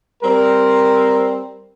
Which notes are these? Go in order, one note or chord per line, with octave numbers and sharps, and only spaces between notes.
G3 C4 A#4